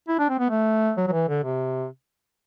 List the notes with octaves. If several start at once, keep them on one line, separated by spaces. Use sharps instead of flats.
E4
D4
C4
B3
A3
F#3
F#3
E3
D3
C3